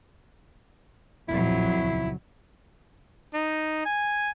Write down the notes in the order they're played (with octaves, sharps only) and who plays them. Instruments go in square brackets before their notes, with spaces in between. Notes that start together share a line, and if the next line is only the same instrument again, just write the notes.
[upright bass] D1 A#1 [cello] F2 F#3 [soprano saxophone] E4
[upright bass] D#1 C#2
[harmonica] D#4
G#5